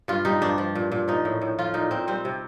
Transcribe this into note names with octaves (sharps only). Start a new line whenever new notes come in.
G2 F4
G3 D#4
G2 D4
F3
A#2
A#2
F3 D#4
A2
A2
F3 F4
A#2 D#4
A#2 C4
G3 C4
C3